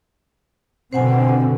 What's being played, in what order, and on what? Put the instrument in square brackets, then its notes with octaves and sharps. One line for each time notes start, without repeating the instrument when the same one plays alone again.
[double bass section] B2 D3 [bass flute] C4 [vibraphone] C5 F#5 G#5